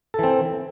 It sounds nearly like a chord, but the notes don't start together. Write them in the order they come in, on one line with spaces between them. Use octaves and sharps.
A4 E3 C4